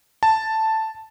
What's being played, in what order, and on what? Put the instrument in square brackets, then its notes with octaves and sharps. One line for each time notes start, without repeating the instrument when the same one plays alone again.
[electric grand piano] A5